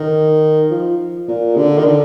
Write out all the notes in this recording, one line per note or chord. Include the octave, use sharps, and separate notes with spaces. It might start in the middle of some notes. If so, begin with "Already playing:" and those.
Already playing: D#3
F3
A#2
D3
D#3
D3